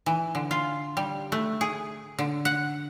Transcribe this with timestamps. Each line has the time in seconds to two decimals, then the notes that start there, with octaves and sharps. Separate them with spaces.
0.06 E3
0.35 D3
0.51 F4
0.97 G3
1.32 A3
1.61 G#4
2.19 D3
2.45 F#5